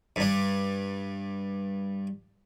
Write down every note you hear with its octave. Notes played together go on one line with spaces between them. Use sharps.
G2 D4